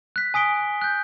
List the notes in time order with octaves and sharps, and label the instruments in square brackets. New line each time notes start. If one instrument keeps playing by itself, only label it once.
[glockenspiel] F#6 B6
G#5 D#6 B6 D7 G7
F#6 G6